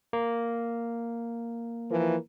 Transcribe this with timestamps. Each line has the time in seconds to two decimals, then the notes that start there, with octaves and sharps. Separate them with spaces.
0.13 A#3
1.91 E3 F3 A#4